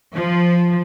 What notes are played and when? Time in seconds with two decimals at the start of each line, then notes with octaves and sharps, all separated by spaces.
0.14 F3